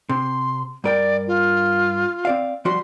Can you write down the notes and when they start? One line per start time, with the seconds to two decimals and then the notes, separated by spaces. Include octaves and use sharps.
0.09 C3 C6
0.84 G2 A#4 D5 G5
1.27 F4
2.25 C4 D5 F5
2.65 F3 G3 F#4 C6